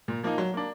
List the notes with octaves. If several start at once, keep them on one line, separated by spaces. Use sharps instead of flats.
A#2
F3 A#3 D#4
F#3
A#3 D4